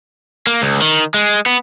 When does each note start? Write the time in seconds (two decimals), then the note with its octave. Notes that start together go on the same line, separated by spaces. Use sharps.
0.47 A#3
0.62 C#2
0.81 D#3
1.14 G#3
1.46 B3